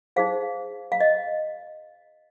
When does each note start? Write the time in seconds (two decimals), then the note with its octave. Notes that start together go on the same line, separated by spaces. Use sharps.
0.16 D#4 G#4 C5 F5
0.92 F5
1.00 D#5